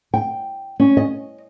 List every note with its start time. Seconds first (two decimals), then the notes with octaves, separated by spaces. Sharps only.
0.14 G5
0.80 C#4
0.97 D#5